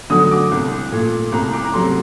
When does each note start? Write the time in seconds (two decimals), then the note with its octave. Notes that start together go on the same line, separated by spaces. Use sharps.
0.10 D3 F#3 A3 D#6
0.31 D6
0.51 C2
0.92 A#2 A3
1.32 C2 A#5
1.53 D6
1.65 A#5
1.73 C3 F#3 A3 C6